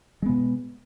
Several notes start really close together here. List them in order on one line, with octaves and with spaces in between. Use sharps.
G#3 B3 B2